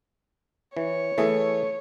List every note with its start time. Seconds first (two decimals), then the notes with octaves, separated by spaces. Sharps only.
0.77 E3 C#5
1.18 E3 A3 G#4